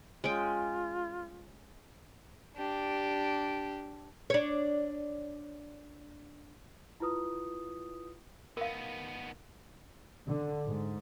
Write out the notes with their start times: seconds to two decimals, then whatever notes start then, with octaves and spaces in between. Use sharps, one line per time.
0.24 G#3 C#4 F4 G5
2.56 D4 G4
4.30 D4 C#5
7.00 E4 F4 B4 D#6
8.57 D#3 B3 A#4 F5
10.27 D3
10.65 G#2